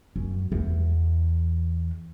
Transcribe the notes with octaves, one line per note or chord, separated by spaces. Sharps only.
F#2
E2